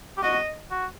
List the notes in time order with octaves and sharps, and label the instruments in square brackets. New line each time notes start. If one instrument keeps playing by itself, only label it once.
[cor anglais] G4
[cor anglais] F#4 [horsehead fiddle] D#5
[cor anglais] F#4